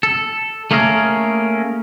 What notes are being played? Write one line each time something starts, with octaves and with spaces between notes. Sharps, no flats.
A4
A3 A#3 C#4 G#4 A#4